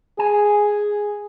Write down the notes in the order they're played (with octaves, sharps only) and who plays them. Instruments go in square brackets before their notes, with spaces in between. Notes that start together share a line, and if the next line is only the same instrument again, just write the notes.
[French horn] G#4 [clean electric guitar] G#5